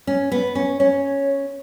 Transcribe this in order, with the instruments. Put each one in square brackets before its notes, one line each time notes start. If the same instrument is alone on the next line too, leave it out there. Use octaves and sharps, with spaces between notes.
[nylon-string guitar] C#4
B3
C#4
[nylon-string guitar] C#4 [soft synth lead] C#5